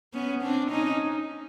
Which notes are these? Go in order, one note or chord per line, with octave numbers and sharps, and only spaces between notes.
B3 C#4
C4 D4
C#4 D#4